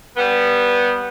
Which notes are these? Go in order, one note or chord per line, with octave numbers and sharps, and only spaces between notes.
G3 B3